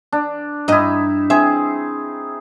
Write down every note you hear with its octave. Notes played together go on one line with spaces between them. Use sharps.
D4
G2 D#4 E4 D#5
C4 G#4 E5